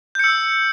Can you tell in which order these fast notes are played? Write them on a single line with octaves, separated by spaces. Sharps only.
G6 C#7 E6